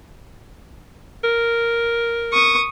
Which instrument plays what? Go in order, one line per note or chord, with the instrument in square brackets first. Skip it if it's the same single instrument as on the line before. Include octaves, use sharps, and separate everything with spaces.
[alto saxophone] A#4
[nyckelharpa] C#6 D#6